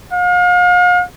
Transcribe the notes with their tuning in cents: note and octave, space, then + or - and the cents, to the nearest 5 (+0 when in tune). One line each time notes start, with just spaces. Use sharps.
F5 +40